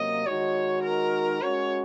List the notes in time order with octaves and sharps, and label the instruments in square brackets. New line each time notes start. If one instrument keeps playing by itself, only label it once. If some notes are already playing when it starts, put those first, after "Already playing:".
Already playing: [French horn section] C3 F#3 A#3 C#4 [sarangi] D#5
[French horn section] D#3 G#3 D#4 F#4 [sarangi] C#5
[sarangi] A#4
[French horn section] G#3 C#4 F#4 [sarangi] C#5